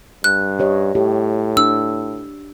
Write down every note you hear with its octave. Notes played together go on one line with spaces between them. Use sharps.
G2 F#6
G4 C#5 D#5
A2 G4
D4 E6